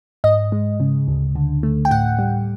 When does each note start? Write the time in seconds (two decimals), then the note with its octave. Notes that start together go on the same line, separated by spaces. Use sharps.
0.24 G#2 D#5
0.52 G#3
0.80 C#3
1.08 D2
1.35 D3
1.63 A3
1.85 G5
1.91 A2 F#5
2.19 G3